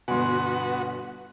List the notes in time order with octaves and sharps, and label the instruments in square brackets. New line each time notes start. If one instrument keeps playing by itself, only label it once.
[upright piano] G1 B2 [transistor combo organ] B3 F#4 [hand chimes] G#5 C6